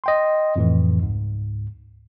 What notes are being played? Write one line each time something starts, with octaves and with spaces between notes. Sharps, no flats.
D#5 G5 C6
F2 A2 E3
C#2 G#2